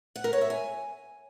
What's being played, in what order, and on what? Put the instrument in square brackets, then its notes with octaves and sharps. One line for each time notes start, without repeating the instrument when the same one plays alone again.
[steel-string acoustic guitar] F#5
A#4
C#5
E5
G#5